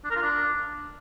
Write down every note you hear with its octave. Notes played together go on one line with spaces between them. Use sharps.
D4
A#4
F4
D4